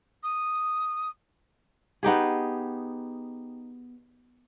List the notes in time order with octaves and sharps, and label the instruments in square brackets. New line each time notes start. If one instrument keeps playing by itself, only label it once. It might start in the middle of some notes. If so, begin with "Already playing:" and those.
[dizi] D#6
[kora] B3 D#4 G4 G#4